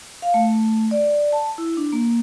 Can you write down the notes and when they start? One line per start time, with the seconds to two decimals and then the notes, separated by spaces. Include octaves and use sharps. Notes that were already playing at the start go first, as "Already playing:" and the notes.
0.22 F5
0.34 A3
0.91 D5
1.33 A5
1.58 E4
1.77 D4
1.93 A#3